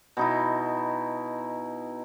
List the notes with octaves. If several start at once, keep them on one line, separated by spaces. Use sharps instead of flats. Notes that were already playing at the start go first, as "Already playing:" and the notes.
B2 D#4 E4